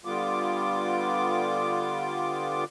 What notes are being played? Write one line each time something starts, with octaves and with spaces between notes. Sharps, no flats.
D3 G3 B3 F4 D6